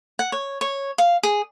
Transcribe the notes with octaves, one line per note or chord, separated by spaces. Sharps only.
F#5
C#5
C#5
F5
G#4